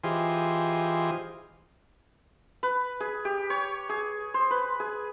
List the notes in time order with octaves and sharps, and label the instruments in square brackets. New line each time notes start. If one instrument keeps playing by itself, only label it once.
[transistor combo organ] E3 F4 G4 G#4 C5 D#5
[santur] B4
G#4
G4
C#5
G#4
C5
B4
G#4